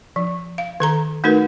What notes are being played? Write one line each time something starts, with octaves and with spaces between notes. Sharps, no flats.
F3
F5
D#3 A4 A#5
A3 D#4 F#4 A#4 B4